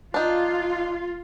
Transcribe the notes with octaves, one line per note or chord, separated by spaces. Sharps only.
D4 D#4 F4